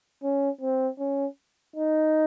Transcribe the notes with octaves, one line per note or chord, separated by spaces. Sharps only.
C#4
C4
C#4
D#4